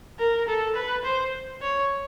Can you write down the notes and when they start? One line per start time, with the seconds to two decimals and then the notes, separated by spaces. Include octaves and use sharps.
0.19 A#4
0.48 A4
0.75 B4
1.04 C5
1.62 C#5